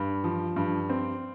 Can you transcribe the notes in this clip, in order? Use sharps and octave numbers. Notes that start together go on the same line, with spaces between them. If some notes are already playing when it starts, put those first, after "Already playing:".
Already playing: G2
F3
G2
C4